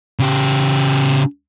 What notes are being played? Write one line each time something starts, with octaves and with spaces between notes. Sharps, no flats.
C#3 G4